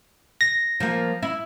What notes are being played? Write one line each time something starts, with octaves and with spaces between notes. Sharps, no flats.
A#6
F3 A#3
E4